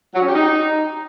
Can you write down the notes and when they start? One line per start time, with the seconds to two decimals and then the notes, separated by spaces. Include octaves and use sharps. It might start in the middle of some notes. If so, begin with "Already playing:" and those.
0.15 F#3
0.21 C#4
0.28 G4
0.35 D#4